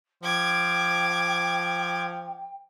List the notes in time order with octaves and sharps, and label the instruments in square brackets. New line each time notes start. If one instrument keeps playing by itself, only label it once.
[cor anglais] F3 [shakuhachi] G5 [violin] D6 G#6